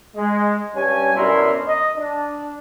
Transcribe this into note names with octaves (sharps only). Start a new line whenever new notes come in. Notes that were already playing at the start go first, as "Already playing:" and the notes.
G#3
G2 G3 C#4 G#5
F#2 B2 D4 E4 A#4 C6
D#5
D4